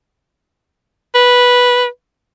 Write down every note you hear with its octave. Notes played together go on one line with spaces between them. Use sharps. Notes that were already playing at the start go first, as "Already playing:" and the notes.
B4